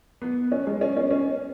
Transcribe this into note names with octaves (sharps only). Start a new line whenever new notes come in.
B3
C#4
G#3
C#4
C#4
C#4